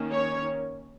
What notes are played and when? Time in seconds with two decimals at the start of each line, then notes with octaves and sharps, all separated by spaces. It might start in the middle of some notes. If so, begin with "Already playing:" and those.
Already playing: D#3 A#3 C#4
0.12 C#5